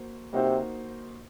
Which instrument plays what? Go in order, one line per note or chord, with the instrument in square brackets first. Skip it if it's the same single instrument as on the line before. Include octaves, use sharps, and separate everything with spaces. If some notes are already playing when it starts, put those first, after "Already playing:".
Already playing: [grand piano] A#3 F#4 C5
[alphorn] C3 [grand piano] A#3 D#4 F#4 C5